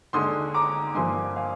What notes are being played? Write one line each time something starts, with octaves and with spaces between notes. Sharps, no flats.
D#2 D3 G#3 C6 D#6
A#5 D6
G2 F3 A#3 G#5 C6
F5 G#5